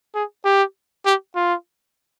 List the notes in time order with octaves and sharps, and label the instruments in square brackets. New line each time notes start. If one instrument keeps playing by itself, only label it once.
[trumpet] G#4
G4
G4
F4